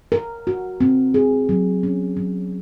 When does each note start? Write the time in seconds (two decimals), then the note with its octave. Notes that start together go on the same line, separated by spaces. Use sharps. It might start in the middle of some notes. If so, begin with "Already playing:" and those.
0.12 A#4
0.47 F#4
0.80 C4
1.14 G#4
1.49 F#3
1.83 C#4
2.17 F#3